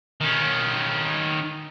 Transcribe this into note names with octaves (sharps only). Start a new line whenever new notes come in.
D#3 C#4